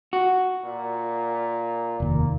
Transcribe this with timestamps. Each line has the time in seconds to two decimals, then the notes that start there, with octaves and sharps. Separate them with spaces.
0.13 F#4
0.65 A#2
2.00 F1 D#2 A#3